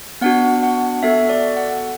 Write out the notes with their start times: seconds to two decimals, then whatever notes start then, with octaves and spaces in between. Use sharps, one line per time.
0.21 B3 D4 F#4 F#5
0.63 F#5
1.03 B3 F#4 A4 E5
1.29 D5
1.57 F#5